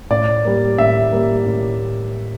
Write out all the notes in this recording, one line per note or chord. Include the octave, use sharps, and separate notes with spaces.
A2 D5
G3 A#3
A2 E5
G3 A#3
A2